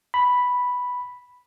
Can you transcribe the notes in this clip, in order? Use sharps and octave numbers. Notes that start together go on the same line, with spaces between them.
B5